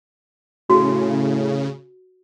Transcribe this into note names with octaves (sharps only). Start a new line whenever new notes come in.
A2 C#3 F#4